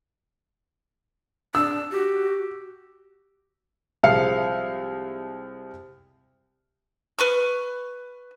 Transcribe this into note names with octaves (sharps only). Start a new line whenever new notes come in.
D4 E6
F#4 G4
C2 F3 G#3 F5 C#7
B4 C#6 F6